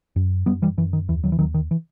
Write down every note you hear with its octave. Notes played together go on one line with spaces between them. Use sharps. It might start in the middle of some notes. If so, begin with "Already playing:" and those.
F#2
F#2 G3 B3
E3 G3
F#2 E3
D#3
D#2 E3
D#3 F#3
E3
D#2 D#3 F#3
D#3
E3